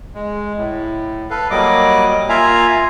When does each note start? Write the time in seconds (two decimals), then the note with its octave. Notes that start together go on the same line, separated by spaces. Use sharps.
0.14 G#3
0.57 A2
1.30 A4 B4 F5
1.51 F#3 G3 A#3 D#5 D6
2.29 A#3 F4 E5 F5 G#5 A#5